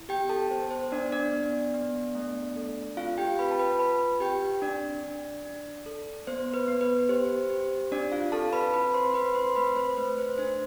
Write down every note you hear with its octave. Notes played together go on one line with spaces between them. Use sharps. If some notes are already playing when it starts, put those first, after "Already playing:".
Already playing: E4
B3 G4 G5
A4 A5
B3 C5
C5
B3 D4 D5
D4 D5
B3
B3
A3
A4
C4 F4 F5
G4 G5
F4 B4 B5
A5
B4 B5
F4 B4 B5
C4 G4 G5
D4 D5
D4
D4
A4
B3 C5
B4
B3
B4
G4 C5
G4
C4 D4 D5
F4 F5
C4 A4 A5
B4 B5
E4 B4 B5
C5 C6
C4 B4 B5
C5 C6
A3 B4 B5
C5
A3 B4
C5
D4 C5